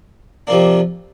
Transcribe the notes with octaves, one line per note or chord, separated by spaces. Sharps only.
C3 F3 A#3 D4